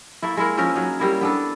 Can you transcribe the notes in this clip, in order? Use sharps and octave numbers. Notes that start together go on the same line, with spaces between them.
A3 A#3 E4
G#3 E4 A#4
F3 C#4 A#4 E5
F#3 D#4
G3 A#3 E4
B3 D4 A4